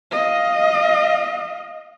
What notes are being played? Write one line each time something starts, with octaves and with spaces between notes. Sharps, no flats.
D#5 F5